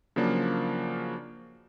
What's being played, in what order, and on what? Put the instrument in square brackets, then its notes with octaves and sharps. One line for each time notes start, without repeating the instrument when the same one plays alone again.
[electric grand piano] C#3 F3 F#3 A#3 D4